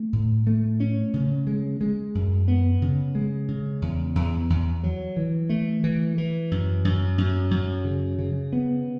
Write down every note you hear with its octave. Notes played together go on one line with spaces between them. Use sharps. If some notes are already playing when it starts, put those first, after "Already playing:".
Already playing: A3
A2
A3
C#4
C#3
G#3
G#3
F#2
B3
C#3
G#3
C#3
E2
E2
E2
F#3
E3
A3
E3
E3
F#2
F#2
F#2
F#2
C#3
C#3
B3